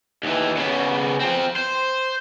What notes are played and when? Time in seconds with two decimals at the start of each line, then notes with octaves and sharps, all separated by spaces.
0.24 D#2 E3
0.57 C#3 B3
1.20 F3 C4
1.56 C5